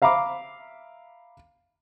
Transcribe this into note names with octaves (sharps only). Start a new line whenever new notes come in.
E5 F5 A#5 B5 D6